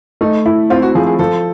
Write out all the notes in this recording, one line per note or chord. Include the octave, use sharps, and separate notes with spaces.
A3 D#4
E4
C4 F4
F#4
F3 G#4
G#4
F3 A4